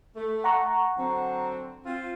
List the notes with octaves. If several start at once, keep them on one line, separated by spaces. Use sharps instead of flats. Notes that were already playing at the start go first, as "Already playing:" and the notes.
A3
F#5 A#5 C#6
D3 F#3 C4
C4 F4